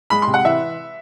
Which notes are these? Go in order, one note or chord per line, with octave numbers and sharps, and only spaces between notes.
G#3 B5
C3 C6
F#5
E3 E5